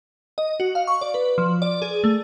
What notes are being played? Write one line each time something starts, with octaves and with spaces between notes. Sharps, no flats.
D#5
F#4
F5
C#6
D5
B4
F3
D5
G#4
A3